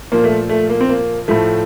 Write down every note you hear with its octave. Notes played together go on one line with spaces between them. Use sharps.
A#2 F3 A#3
A3
A3
A#3
C4
A#3
A2 F3 A3